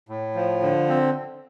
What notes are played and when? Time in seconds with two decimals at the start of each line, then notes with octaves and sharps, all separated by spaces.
0.09 A2
0.35 F3
0.62 D3
0.89 C4